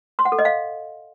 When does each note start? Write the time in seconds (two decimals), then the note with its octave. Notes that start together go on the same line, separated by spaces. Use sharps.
0.19 C6
0.25 F#5
0.32 A4
0.39 D#5
0.45 F5